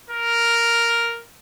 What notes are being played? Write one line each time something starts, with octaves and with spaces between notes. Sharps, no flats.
A#4